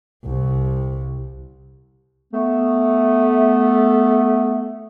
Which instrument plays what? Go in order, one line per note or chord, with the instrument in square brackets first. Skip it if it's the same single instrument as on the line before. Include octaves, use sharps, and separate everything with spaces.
[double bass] C2 C3
[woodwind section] A3 B3